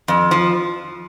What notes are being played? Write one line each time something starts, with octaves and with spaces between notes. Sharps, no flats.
F2
F3